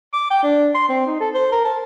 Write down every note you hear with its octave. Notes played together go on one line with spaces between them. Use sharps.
D6
G5
D4
C6
C4
D#4
A4
C5
A#4
A5